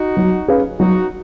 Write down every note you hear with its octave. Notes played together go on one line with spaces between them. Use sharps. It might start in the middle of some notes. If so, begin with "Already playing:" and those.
Already playing: D#4 F#4
F#3
C#4 G#4 B4 F5
F#3 D#4 F#4